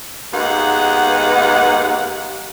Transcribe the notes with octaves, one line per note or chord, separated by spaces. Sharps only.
D#2 G#3 B3 F5 F#5